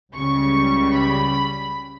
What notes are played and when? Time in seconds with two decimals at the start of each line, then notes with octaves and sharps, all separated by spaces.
0.14 C#2 C#3 G3 C#6
0.93 B5